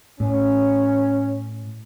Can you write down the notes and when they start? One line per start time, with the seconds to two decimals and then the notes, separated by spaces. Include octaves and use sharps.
0.20 A2 C#4